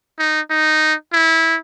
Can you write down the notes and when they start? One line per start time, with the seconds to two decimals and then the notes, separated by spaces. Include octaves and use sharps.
0.19 D#4
0.50 D#4
1.12 E4